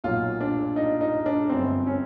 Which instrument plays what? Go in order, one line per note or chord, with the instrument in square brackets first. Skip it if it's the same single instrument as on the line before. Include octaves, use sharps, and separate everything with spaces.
[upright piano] B1 A#2 F#3 F4
D4
D#4
D#4
D4
G1 F#2 D3 C4
C#4